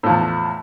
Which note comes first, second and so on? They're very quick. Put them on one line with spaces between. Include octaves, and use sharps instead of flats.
A2 F3 E2